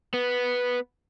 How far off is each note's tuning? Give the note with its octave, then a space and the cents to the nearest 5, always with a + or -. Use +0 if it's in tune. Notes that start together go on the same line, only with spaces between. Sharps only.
B3 -5